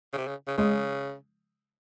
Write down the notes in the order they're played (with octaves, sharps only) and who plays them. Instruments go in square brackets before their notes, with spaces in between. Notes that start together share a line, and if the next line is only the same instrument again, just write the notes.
[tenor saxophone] C#3
C3
C#3
C#3
[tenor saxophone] C#3 [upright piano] G#3